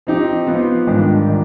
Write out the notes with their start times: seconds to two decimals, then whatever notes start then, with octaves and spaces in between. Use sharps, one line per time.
0.07 F3 C4 D#4 G4
0.47 F3 B3 F4
0.87 G#2 D#3 G3 D4 G4
1.29 D#3